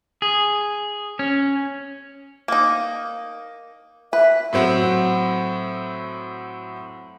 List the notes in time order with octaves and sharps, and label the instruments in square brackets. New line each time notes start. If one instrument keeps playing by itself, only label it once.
[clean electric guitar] G#4
C#4
[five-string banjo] A#3 D#4
[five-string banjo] B4 [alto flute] E5
[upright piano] A2 F#3 C4 F#4